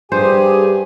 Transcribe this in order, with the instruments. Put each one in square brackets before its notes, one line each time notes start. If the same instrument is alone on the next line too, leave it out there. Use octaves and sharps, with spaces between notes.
[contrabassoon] G2 [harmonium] G4 G#4 G#5 [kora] C5